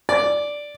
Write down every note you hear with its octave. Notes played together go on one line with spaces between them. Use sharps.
D5